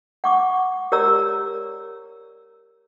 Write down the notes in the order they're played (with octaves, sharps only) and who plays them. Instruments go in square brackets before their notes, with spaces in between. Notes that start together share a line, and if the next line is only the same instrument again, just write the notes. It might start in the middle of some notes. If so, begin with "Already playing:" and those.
[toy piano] F#5 C#6 D6
G4 A#4 C#5 D5 A#5 E6